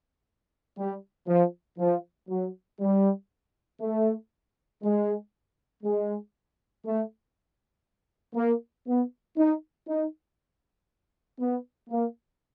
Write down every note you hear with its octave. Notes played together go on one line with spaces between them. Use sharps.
G3
F3
F3
F#3
G3
A3
G#3
G#3
A3
A#3
B3
D#4
D#4
B3
A#3